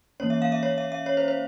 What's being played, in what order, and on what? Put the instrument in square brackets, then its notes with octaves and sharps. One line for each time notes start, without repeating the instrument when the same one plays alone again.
[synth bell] E3 A#3 C#4 C#5
E5
F5
E5
C#5
E5
E5
C#5
C5
C5